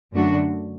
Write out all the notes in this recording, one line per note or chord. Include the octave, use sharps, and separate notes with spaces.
F#2 D3 A3 D4 F#4